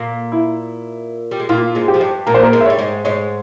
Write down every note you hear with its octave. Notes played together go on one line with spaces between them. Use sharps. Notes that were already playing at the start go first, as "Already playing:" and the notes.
Already playing: A#2 A#3
E4
G3
G#3
A#2 A#3 F4
G#2 G#3
G4
F3
G2 G3
A#2 A#3 A#4
C5
A#4
G#2 G#3
E5
G3 C#5
G#2 G#3
G#2 G#3 C#5